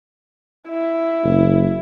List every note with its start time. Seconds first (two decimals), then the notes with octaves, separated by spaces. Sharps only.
0.69 E4
1.24 F#1